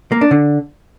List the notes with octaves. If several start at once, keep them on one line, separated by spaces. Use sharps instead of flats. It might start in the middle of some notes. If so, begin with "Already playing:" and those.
A#3
D4
D3